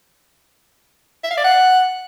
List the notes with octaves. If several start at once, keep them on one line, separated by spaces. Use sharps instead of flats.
E5
F5
D5
F#5